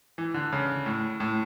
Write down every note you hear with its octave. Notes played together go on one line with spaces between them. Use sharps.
E3
D3
C#3
A2
A2